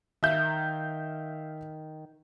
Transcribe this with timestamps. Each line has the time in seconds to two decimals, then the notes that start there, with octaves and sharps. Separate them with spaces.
0.23 D#3 E5 F5 G6